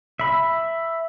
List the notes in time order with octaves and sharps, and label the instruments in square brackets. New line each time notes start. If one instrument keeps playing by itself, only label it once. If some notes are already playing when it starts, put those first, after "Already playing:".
[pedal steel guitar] E5 B5